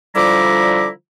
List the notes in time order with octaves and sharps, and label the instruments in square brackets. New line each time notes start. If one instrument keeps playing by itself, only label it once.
[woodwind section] D3 F3 G3 E4 A#5 D6